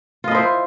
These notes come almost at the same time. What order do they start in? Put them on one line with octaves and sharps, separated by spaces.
F4 D#5 E4 C5